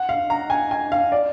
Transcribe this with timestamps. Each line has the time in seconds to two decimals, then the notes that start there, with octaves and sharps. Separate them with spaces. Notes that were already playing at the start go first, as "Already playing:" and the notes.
Already playing: F#5
0.09 F5
0.30 A#5
0.50 G#5
0.71 G#5
0.92 F5
1.12 D5